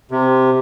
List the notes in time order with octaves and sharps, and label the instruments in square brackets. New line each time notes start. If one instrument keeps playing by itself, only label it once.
[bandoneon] C3